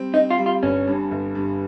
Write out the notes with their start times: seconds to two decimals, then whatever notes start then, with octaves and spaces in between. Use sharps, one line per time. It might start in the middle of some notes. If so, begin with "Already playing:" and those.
Already playing: G3 C4
0.14 C4 D#4
0.31 F4
0.38 G3
0.46 F4
0.63 G1 C#4
0.87 G2
1.11 G1
1.35 G2